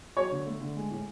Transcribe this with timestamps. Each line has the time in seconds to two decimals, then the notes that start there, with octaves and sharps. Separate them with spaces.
0.17 F#3 C#5
0.31 D3
0.46 A3
0.61 D3
0.76 G#3
0.91 A2